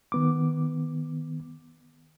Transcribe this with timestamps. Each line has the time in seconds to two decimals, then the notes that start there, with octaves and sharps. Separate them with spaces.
0.12 D#3 B3 D6